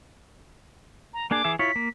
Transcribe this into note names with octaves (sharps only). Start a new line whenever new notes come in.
A#5
A#3 D4 G#4 D6
E3 G#4 E5
E4 F4 C#5 B6
A#3